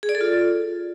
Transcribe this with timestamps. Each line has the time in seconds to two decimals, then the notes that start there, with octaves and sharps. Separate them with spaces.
0.03 G#4
0.09 D5
0.15 A4
0.21 F4